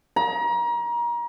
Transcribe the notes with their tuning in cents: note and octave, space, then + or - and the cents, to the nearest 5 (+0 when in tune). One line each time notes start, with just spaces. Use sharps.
A#5 +30